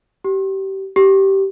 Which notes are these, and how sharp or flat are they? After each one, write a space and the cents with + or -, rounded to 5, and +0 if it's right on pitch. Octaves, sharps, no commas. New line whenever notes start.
G4 -25
G4 -15